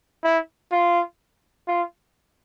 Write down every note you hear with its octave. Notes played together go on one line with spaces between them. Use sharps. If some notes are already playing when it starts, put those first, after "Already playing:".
E4
F4
F4